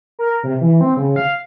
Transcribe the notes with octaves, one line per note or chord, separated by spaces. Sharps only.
A#4
C3
E3
C4
C#3
F5